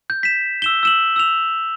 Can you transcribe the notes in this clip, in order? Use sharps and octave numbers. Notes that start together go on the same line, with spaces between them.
G6
B6 E7
E6 E7 G7
E6 E7 F#7
E6 F7